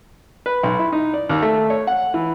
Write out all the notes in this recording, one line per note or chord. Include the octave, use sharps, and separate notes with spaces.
B4
B1
E4
D#4
D5
D#2
A3
C#5
F#5
E3